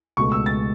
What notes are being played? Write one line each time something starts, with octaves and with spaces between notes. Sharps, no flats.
C#2 B2 A3 C#6
E6
A6